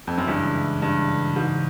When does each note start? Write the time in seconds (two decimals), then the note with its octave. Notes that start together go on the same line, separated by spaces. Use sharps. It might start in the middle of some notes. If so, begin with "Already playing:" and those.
0.07 F2
0.18 F#2
0.27 G2 C#3 E3 G#3 C#4 E4
0.82 G2
1.36 G#2